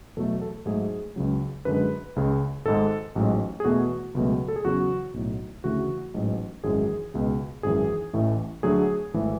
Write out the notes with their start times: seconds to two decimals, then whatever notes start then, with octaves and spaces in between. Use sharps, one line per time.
0.16 E2 B2 F#3 A3 A4
0.42 A4
0.66 G#2 F#3 A3 G#4
1.16 C#2 C#3 F#3
1.65 F#2 D3 G#3 B4
2.16 C#2 C#3 G#3
2.66 G#1 G#2 G#3 A4
3.15 A1 G#2 F#3
3.60 G#4
3.64 E2 B2 A3 F#4
4.15 C#2 B2 F#3 A3
4.48 A4
4.56 G#4
4.65 E2 C#3 F#3 F#4
5.14 B1 A2 F#3
5.64 D2 C#3 E3 A3 F#4
6.14 A1 G#2 F#3
6.64 G#1 F#2 E3 G#3 G#4
7.14 C#2 B2 G#3
7.63 G#1 F#2 E3 G#4
8.13 A1 A2 E3 A3
8.63 D2 D3 F#3 A3 G#4
9.14 G#1 E3 A3